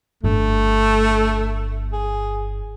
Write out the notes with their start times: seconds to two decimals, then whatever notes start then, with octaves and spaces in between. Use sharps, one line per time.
0.24 G1 A3 D4
1.92 G#4